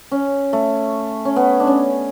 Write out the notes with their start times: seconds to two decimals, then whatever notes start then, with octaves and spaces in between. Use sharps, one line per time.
0.12 C#4
0.53 A3
1.25 C#4
1.36 B3
1.60 D4
1.67 C#4